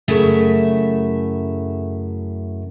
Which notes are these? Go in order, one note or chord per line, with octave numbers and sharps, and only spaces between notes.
F#2 C#3 A3 E4 E5